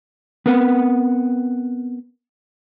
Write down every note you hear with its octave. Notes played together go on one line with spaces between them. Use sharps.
B3 C4 A#4 B4 F#5